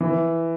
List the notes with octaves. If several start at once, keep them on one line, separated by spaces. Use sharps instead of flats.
E3